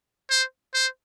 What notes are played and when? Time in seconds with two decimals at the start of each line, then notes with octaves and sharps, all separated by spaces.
0.30 C5
0.74 C5